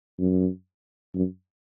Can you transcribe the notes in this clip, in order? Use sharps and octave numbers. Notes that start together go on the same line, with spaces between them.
F#2
F#2